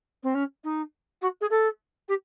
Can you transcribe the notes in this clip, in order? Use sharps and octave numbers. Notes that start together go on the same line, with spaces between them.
C4
C#4
D#4
F#4
G#4
A4
G4